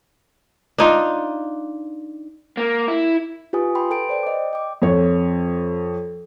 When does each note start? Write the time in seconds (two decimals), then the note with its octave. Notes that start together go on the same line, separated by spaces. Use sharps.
0.78 D4 D#4 F4
2.57 A#3
2.88 E4
3.53 F4 G4 B4 G#5 D#6
3.75 G5 B5 C6
3.90 A4 B4 G5 A5 D7
4.09 C5 D5 G5
4.23 D#5 D6
4.53 G5 D6
4.82 F2 C#5